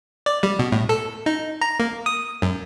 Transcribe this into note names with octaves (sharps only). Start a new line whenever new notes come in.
D5
G3
B2
A2
A4
D#4
A#5
A#3
D#6
F#2